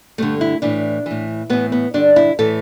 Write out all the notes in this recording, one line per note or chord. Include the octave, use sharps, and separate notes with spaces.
G2 D3 A3
E4
A2 E3 D4
A2 E3
A2 E3 B3
B3
G2 D3 D4
E4
A2 E3 A4